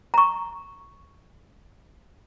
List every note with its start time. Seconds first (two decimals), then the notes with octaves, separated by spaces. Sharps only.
0.14 A#5 C#6